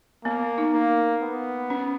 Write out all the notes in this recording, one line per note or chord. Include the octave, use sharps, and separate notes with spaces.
A#3 B3
D#4
A#3
B3
C#4